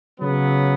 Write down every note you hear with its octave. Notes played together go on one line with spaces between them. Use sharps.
C#3 F#3 B3